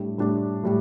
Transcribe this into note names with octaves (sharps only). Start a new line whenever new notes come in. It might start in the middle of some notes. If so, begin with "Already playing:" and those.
Already playing: A2 G3 D4
A2 G3 D4
A2 G3